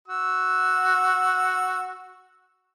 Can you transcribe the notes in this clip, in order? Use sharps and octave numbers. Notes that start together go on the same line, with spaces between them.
F#4 E6